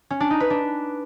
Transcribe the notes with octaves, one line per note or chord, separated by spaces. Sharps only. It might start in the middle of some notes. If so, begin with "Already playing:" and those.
C#4
D4
D#4
B4
D4